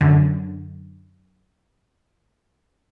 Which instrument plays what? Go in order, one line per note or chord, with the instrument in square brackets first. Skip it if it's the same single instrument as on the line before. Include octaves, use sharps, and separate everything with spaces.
[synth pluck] F#2 D3